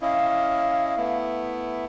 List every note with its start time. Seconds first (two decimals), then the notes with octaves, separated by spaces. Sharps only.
0.02 C#4 E4 D#5 F5
0.97 A3 B3 E4